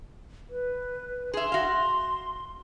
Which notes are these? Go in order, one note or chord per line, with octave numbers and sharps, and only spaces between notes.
B4
G#4 E5 C6
F#4 F5